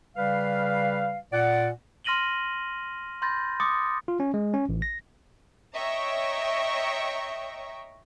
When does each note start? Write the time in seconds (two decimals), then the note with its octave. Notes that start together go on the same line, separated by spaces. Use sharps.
0.16 C#3 G3 B4 F5
1.32 A#2 D5 F#5
2.04 C6 F6 A#6 D#7 F#7 G7
3.22 B5 C6 G6 A6 A#6
3.60 C6 D6 D#6 A6 C#7
4.08 F4
4.20 C#4
4.34 G#3
4.54 C#4
4.69 A1
4.82 A#6
5.75 C#5 D#5 E5 G5 A#5 C#6